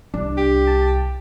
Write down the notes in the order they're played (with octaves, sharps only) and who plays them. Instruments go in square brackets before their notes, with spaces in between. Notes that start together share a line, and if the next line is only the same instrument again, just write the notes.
[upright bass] C2 [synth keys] D4
[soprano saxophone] G4
[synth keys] A5